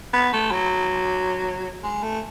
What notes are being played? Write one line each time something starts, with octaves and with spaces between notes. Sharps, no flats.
B3
A3
F#3
G#3
A3